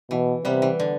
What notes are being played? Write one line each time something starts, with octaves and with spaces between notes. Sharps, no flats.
B2 E3
C3 G3 B3
E3
D3